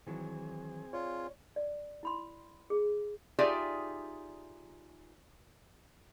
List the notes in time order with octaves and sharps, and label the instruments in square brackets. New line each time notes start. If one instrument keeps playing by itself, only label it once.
[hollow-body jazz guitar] D#3 E3 F#3 [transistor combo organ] C4 G#4
[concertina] F4 [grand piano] C#5 D5
[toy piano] D5
E4 B5 C6
G#4
[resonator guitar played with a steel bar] D#4 F4 G4 G#4 D5 E5